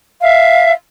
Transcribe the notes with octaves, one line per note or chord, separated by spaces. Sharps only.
E5 F5